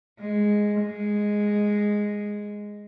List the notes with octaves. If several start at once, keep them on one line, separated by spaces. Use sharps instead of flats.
G#3
G#3